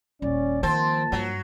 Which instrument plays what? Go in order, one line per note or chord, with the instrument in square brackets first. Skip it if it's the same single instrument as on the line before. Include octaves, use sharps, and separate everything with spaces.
[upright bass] D#1 [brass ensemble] C#4 [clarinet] D5
[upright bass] D#3 [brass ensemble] F3 A#3 [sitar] C4 C5 [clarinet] A5
[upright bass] G2 [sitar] F#3